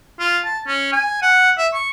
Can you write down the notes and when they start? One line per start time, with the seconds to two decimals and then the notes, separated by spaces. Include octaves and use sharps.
0.19 F4
0.45 A5
0.67 C#4
0.92 G#5
1.22 F#5
1.58 E5
1.73 C#6